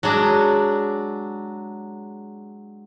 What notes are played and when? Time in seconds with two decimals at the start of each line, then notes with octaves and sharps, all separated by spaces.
0.03 F#3 G#3 D4